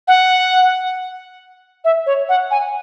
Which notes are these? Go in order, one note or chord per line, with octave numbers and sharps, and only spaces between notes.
F#5
E5
C#5
F#5
G#5